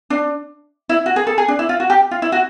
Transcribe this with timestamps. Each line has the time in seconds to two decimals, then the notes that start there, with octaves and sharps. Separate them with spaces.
0.10 D4
0.89 E4
1.06 F#4
1.16 G#4
1.27 A4
1.38 G#4
1.48 D4
1.59 E4
1.69 F4
1.80 F#4
1.90 G4
2.11 F4
2.22 E4
2.32 F#4